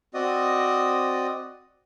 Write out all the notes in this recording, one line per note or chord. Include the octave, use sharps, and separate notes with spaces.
C4 F#4 D5 D#5 D#6